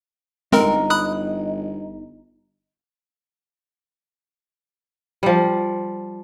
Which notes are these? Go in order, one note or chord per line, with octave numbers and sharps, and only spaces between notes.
G1 G#3 C4 D#4 A#4
B5 D#6 F#6
F3 G3